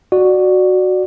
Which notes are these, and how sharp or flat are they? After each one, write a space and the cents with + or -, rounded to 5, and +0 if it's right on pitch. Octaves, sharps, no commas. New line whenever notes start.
F#4 +0 D5 +15